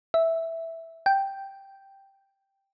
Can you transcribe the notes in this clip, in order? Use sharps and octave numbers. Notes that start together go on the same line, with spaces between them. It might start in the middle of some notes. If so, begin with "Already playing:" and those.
E5
G5